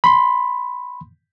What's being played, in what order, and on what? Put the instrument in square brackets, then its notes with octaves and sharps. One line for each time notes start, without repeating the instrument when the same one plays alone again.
[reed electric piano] B5 C6